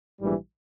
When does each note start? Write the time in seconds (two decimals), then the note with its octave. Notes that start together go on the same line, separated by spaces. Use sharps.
0.20 A#1 G#2 E3 G3